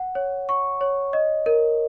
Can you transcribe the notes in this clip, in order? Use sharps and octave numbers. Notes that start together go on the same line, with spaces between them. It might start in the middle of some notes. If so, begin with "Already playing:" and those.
Already playing: F#5
C#5
C#6
C#5
D#5
A#4